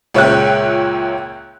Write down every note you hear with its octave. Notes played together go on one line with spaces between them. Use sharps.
C#2 A#2 C#5 E5 G5 F#6